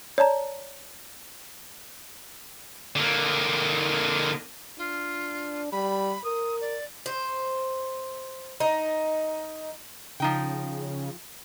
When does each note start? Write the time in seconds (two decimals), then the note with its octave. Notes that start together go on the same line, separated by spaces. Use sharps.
0.18 C#5 D5 A5 A#5
2.96 D3 A#3
4.78 D4 F4
5.72 G3 B5
6.24 A#4 D#6
6.61 D5
7.06 C5
8.60 D#4
10.20 C#3 F3 D#4 G5